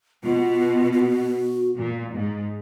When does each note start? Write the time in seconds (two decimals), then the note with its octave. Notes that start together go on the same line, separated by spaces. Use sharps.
0.24 B2 F4
0.93 F4
0.99 F#4
1.76 A#2
2.14 G#2